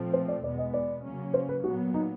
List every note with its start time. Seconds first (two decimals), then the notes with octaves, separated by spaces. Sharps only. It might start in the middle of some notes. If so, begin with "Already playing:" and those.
Already playing: A#2 F3 A3 C4
0.13 C5
0.28 D5
0.44 E2 B2 G#3 B3 D5
0.58 D#5
0.74 D5
1.04 C#3 F#3 A#3 C#4
1.34 C5
1.49 B4
1.64 A#2 F#3 B3 F#4
1.94 D#4